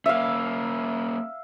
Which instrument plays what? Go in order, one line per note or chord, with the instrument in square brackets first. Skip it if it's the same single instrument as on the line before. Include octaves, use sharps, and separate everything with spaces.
[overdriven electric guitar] A#3 C#4 [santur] E5 F5